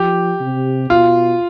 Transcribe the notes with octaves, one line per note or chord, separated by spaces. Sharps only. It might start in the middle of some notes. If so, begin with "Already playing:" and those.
Already playing: F3 G4
C3
B2 F4